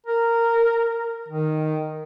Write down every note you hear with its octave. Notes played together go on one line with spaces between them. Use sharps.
A#4
D#3